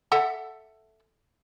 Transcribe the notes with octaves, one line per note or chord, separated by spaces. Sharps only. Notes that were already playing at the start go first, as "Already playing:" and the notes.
A4 E5 F#5